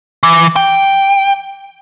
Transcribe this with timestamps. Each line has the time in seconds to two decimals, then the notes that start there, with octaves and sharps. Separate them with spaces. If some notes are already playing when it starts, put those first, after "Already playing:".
0.23 E3
0.56 G5